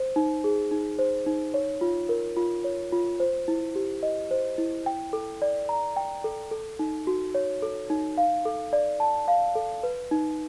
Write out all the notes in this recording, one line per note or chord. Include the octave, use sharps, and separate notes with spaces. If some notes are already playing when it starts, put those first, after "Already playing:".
Already playing: C5
D#4
G#4
D#4
C5
D#4
C#5
F4
A#4
F4
C#5
F4
C5
E4
G4
D#5
C5
E4
G5
A4
D5
A#5
G5
A4
A4
D#4
F#4
C#5
A4
D#4
F5
A4
D5
A5
F5
A4
B4
D#4